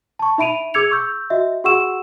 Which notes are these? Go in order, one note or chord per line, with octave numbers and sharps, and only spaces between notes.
A5 C#6
D#4 E5 B5 D7 D#7 F7
G#4 D6 E6 G#6 C#7 F7
C#6 E6 G6
F#4 D#5 E5
F#4 G#4 F#5 C#6 E6 E7